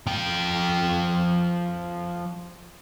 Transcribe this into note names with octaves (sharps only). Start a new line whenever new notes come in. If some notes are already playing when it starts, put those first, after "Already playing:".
F3 G5